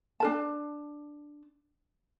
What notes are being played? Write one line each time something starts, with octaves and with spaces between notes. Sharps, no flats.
D4 A#4 A5